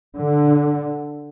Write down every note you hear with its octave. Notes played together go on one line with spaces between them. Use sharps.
D3